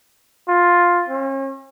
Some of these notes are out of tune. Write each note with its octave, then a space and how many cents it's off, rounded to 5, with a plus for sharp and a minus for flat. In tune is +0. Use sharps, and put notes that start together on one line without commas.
F4 +5
C#4 -40